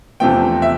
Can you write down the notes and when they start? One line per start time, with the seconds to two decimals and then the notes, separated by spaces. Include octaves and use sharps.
0.20 E2 C3 F3 A3 G5
0.62 E5